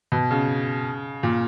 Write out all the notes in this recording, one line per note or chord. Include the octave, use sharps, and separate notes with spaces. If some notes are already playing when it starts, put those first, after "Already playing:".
B2
C#3
A#2